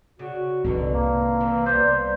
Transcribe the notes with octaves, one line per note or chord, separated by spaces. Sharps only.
C#3 F#4
C2 F2 G#2 D3 E3
A#3
E3
G3 B3 C5